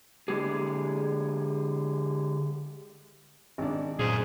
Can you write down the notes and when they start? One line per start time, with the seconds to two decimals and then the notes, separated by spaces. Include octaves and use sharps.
0.28 D3 G#3 G4 G#4
3.58 G#1 D4
3.99 F#2 A#2 G#4 C5